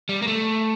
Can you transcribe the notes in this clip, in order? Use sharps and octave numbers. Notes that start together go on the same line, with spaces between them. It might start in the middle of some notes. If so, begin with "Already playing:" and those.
G3
A#3
A3